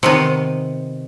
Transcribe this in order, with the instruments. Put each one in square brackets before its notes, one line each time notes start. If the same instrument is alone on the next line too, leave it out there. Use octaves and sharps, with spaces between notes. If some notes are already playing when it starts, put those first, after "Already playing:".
[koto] C3 D#3 B3